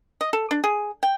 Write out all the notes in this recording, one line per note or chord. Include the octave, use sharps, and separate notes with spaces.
D#5
A4
D4
G#4
G5